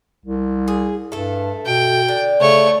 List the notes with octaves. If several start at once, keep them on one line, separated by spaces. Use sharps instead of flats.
C2
G#4
G2 A3 A4
B2 G5
D3
C#3 A3 C#5